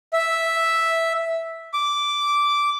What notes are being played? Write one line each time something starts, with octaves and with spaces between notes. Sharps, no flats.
E5
D6